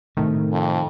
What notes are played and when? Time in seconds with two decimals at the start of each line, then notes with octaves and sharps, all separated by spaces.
0.17 A2 C3 D#3 A3
0.52 F2